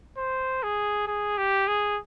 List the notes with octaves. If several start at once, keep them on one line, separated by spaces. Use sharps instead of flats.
C5
G#4
G#4
G4
G#4